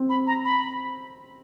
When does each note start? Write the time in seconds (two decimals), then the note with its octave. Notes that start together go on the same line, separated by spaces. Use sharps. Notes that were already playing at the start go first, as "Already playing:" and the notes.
Already playing: C4
0.09 B5
0.27 A#5
0.45 B5